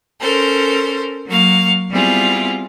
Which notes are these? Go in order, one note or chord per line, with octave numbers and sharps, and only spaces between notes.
C#4 A4 A#4 C5
F#3 A#3 F5 C#6
G3 B3 C4 E4 F4 G#4